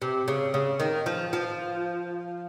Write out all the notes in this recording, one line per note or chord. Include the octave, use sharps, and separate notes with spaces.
C3
C#3
C#3
D#3
F3
F3